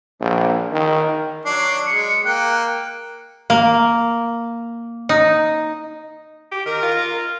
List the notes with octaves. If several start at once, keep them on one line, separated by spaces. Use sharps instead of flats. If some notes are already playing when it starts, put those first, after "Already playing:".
A#1
D#3
F#3 D4 C7
G#3 C#7
A#3 G5 F#6
A#3
D#4
G4
D#3 A#4
F4